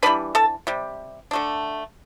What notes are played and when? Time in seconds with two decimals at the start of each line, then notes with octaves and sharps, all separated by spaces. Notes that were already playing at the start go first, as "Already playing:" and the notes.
0.03 E3 G3 B3 D4 B4 B5
0.35 A4 A5
0.67 C3 G3
1.31 D3 A3 D4